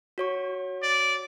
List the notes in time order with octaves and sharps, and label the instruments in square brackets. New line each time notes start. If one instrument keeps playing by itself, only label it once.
[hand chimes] F#4 C#5 C#6
[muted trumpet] D5